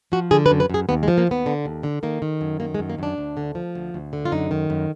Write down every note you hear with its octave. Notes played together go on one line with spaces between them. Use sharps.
F3 F#4
D3 G#4
B4
F#2
B4
F#2 G#4
D#2 B3
G#3
F3
A#3
D#2 B3
D3
D#2
D3
D#3 A#3
D#3
F#2
D#3 A#3
G#3
F#2
A#3
F#2 D4
D2
D3
F3
D2
D2
D3
F4
F#2 D#4
D#3
F#2